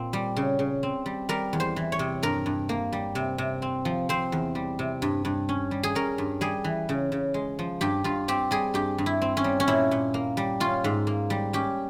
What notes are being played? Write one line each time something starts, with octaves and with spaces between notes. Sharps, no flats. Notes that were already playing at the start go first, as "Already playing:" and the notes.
Already playing: A#2 C4
G3
C#3
C#3
C4
G3
G3 A#4
E2
C5
E3
C#5
C3
G2 A#4
G2
A#3
G3
C3
C3
C4
F3
C4 C5
E2
G3
C3
G2
G2
C#4
G3
G#4
C#4 A#4
G2
G3 G#4
E3
C#3
C#3
G#3
F3
G2 G4
G2 F4
C4 G4
G3 G#4
G2 G4
G2
E4
C4
C#4
G3
C#4
A#2 E4
A#2
A#3
G3
C#4 F4
G#2
A#3
G3
C#4 G4